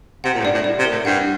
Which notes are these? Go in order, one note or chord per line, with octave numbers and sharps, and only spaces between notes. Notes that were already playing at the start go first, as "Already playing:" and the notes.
C3 F#5
A#2
A2
G2 D5
A2
D5
C3
A#4
A2
G2 F#5